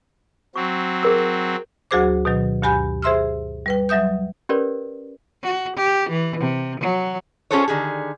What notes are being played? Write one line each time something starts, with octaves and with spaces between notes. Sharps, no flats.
F#3 C4 C#6
G#4 A#4 E6
D2 F#3 F#4 G#4 C5 D6
B2 D#3 F#3
D2 G2 G4 G#5 B5 G6
G#4 C5 E5 C6 E6 F6
G3 B4 G5
F#3 G3 E5 D#6 G6
C#4 G4 A#4 B4 C#5 D5
F#4
G4
E3
C3
F#3
C#4 F4 G#4 A4 C5 C#5
D3 D#3 G4 G#4